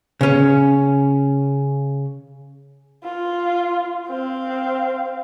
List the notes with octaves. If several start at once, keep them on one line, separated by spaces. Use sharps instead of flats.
C#3 C#4
F4
C4 F5